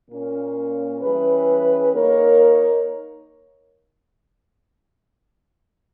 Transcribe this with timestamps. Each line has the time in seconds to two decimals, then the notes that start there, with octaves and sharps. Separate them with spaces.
0.10 A#2 A#3 C#4
1.01 E3 G3 C#4 G#4 B4
1.93 A#3 D#4 A#4 C#5